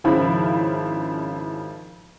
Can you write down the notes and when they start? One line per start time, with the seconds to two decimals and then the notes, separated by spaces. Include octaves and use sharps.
0.04 G#1 C#3 F3 E4 B5